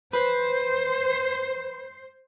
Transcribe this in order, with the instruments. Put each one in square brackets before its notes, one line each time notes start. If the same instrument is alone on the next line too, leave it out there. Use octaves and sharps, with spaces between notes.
[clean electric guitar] B4 [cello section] C5